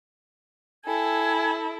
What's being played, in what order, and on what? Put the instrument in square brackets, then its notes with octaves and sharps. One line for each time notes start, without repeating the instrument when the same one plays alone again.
[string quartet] E4 A4 [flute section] G5 G#5 G#6